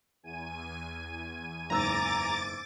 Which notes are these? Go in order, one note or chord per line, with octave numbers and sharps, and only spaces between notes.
E2 G#5 D#7
F#1 G#2 A#5 D6 E6 A6